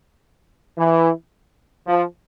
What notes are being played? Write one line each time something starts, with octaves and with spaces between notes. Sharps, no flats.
E3
F3